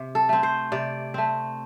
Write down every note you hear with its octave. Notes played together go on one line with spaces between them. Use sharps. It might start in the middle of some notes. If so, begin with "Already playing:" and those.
Already playing: C3
A4
A3 C4
C5
C3 D5
A3 C4